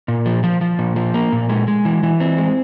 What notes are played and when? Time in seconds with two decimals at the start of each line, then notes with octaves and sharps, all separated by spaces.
0.08 A#2
0.26 F3
0.44 F3
0.61 F3
0.79 A#2
0.96 F3
1.14 A#3
1.33 A#2
1.49 G#3
1.68 G#3
1.85 E3
2.03 E3
2.20 C4
2.38 G#3